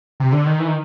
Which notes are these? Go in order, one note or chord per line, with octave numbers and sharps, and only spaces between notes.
C3
D3
D#3
E3
D#3